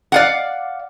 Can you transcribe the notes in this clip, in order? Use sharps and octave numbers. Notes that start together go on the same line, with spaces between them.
D5 F5 F#5